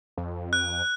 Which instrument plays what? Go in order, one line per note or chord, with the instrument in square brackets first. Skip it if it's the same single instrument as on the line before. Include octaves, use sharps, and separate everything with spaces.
[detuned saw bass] F2
[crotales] F#6